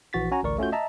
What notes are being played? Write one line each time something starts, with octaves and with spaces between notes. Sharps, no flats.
A#1 E3 F#4 A6 B6
C#4 F#4 G#5 A#5
A1 D2 A#4 D5 C#6
A3 C#4 F4 F#4 G6
D#5 E5 A5 A#5